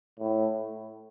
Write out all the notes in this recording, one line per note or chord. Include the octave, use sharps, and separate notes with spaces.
A2